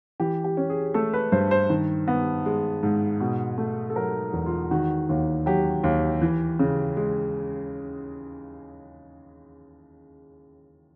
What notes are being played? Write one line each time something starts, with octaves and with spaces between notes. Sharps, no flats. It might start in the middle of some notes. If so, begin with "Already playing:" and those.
E3 G4
G4
C#4
G#4
A3 A4
B4
G2 C5
C5
D#3
B3
G#3
G#2
B2
A3
A4
F#3 A#4
E2
F4
D#3 F#4
D#2
F#3 G4
D#2
E3
C#3
G#3